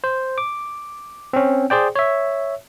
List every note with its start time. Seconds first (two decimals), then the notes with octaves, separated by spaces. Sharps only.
0.04 C5
0.38 D6
1.33 C4 C#4
1.70 G#4 C5 D5 G5
1.96 C#5 E5